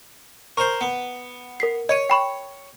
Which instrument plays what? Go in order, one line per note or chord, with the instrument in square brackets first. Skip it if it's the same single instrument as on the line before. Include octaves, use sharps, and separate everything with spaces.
[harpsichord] A#4 C5 [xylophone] C#6
[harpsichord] B3
[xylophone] A#4 B6 C7
[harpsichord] C#5 [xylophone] D#5 D#7
[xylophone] G5 B5 C#6